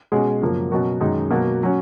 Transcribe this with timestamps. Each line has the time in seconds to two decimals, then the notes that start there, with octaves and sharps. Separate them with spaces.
0.12 B2 G#3 C#4 G#4
0.41 F#2 C#3 F3 A#3
0.71 B2 F#3 C#4 F#4 A#4
1.00 F#2 D#3 G#3 D#4
1.31 B2 F#3 A#3
1.63 F#3 C#4